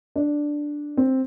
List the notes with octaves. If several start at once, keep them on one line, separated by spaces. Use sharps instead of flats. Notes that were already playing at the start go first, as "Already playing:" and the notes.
D4
C4